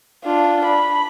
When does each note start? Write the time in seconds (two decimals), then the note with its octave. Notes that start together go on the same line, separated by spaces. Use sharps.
0.25 D4 F4
0.65 B5